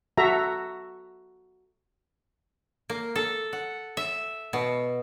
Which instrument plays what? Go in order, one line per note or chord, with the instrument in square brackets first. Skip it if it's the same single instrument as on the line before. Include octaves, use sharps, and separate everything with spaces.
[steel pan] F#4 A4 E5 A#5
[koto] A#3
A4
F#5
E5
B2